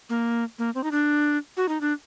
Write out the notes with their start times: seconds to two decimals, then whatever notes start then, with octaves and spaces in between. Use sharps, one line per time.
0.09 A#3
0.59 A#3
0.75 C4
0.84 D#4
0.91 D4
1.57 F#4
1.69 D#4
1.81 D4